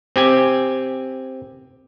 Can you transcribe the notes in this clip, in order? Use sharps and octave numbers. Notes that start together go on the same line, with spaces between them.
C4 G4 G#5